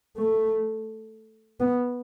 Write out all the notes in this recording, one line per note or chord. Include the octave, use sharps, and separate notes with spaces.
A3
B3